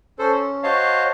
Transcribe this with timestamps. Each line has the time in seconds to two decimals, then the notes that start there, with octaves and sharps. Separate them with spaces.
0.19 C#4 A4 C5
0.63 F#4 C5 C#5 D#5 F5 A5